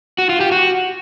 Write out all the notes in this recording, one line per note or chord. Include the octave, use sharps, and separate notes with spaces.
F#4
F4
G4
F#4